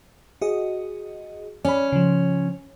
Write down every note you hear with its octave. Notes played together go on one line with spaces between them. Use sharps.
F#4 G#4 D#5
C#4 D5 B5
C#3 F3